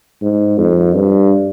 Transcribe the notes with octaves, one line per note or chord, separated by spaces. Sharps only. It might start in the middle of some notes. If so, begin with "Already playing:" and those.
G#2
F2
G2